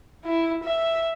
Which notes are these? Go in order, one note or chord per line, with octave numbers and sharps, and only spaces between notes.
E4
E5